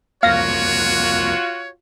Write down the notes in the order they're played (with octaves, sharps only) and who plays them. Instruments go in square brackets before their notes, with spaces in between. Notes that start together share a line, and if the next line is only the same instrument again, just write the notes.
[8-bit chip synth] C2 F2 A#3 [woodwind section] F4 F#4 [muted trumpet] C#5 [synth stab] F5 A#6